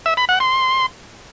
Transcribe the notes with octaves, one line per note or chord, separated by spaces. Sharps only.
E5
B5
F#5
C6